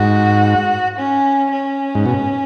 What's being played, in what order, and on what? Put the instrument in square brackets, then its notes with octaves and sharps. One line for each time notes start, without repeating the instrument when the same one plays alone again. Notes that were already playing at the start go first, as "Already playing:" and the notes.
Already playing: [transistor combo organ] G#2 [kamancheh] F#4
[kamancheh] C#4
C#4
[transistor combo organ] G#2
B2